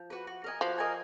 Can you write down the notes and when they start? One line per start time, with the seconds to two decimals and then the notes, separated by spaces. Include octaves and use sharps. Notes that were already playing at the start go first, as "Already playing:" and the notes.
Already playing: F3
0.10 F#4 B4
0.27 F#4
0.44 A#4 D#5 G#5
0.61 F3 F#4
0.78 A#4 D#5 G#5